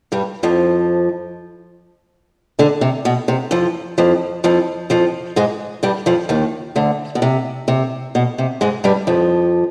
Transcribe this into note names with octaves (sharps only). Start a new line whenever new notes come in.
G2 G3
F2 F3
D2 D3
C3
B2
C3
F2 F3
F2 F3
F2 F3
F2 F3
G#2 G#3
G2 G3
F2 F3
D#2 D#3
D2 D3
B2
C3
C3
B2
C3
G#2 G#3
G2 G3
F2 F3